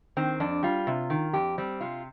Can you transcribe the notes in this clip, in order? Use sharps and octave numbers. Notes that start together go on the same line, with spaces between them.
D#3 C4
F2 D4
G3 F4
C3
D#3
F2 G4
G3 C4
C3 F4